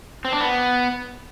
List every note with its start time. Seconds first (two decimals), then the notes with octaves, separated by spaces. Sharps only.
0.25 C4
0.33 D4
0.41 B3